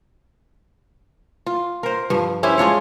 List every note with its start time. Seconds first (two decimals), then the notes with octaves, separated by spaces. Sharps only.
1.46 F4
1.83 A#4 C5
2.10 G2 F3
2.43 C#4 E4 G4 C5
2.58 G#3 D4 F4 C#5